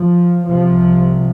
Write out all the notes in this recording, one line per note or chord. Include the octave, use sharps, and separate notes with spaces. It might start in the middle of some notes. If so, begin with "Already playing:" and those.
Already playing: F3
C2 C3 F3